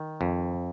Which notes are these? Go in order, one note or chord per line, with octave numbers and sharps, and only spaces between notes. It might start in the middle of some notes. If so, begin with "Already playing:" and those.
Already playing: D#3
F2